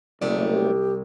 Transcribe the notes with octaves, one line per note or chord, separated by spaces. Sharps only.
F#1 C2 A3 B3 D5
G4